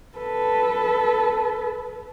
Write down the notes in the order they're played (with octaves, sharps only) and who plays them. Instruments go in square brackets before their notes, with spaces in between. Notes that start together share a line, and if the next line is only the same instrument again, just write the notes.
[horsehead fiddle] A4 B4